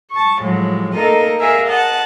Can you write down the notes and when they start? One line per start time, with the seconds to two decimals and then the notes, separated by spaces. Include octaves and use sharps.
0.10 A5 C#6
0.39 A2 F3 F#3 G#3
0.93 A3 A#3 D#4 A4 A#4 D#5
1.40 G#4 A#4 E5 F5 G#5
1.68 D#5 F#5 A5